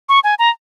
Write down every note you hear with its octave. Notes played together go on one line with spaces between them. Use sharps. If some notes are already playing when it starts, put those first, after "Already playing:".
C#6
G#5
A#5